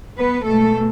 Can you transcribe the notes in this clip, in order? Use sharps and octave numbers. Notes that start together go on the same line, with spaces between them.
B3 B4
B2 G#3 A3 A4